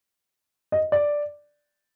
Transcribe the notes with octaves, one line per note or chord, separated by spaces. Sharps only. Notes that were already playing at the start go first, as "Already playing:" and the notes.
D#5
D5